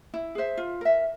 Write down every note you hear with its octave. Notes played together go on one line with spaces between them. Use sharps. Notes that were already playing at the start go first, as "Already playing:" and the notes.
E4
G#4 C5 E5
F4
A#4 E5